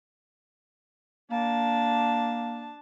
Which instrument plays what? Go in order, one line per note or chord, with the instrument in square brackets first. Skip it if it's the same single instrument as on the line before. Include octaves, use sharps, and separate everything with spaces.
[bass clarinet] A#3 [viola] D4 A5